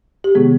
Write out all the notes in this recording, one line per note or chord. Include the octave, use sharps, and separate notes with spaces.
G4
C3 D#3 G#3 B3 G#4